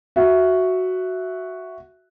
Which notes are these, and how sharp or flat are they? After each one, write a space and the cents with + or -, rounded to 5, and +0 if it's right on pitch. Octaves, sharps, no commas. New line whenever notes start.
F#4 +0 E5 +0